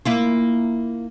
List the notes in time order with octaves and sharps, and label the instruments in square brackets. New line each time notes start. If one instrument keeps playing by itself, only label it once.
[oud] A#3 E4 F4